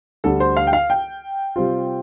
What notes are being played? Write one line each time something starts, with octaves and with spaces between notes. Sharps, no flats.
D2 D3 G3 A4
C5
F5
G5
F5
G5
C3 G3 C4 F4